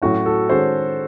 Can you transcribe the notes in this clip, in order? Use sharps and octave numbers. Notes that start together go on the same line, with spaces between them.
A2 F#3 A3 C#4 F#4
A4
D#3 G#3 C#4 F#4 A4 C5